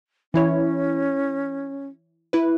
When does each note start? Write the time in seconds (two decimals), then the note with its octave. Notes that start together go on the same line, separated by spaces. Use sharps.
0.34 E3 C#4 E4 C#5
2.33 E4 B4